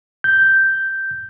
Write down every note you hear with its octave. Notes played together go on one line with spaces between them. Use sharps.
G6